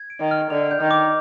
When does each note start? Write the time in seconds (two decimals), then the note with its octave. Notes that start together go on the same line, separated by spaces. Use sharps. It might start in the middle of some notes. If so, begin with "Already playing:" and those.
Already playing: G#6
0.10 D7
0.20 D#3
0.31 F6
0.50 D3 F7
0.71 G6
0.81 D#3
0.91 D6